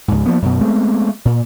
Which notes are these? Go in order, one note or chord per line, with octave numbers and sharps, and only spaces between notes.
C#2 G#2
F3 G#3 A#3 B3
F#2 B2
G#3 A3 B3 C4
A#2